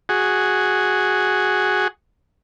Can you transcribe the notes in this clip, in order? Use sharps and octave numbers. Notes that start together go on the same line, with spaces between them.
F#4 G#4